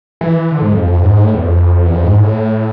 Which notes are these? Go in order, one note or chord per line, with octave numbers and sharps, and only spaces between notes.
E3
D3
G#2
F2
F2
F2
G#2
G#2
A2
E2
F2
E2
F2
G#2
A2